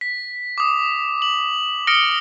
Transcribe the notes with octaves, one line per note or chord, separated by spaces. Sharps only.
B6
D6 D#6
F#7
D#6 F6 A#6 C#7 D7 G7